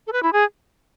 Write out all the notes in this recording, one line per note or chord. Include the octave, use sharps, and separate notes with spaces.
A4
B4
E4
G#4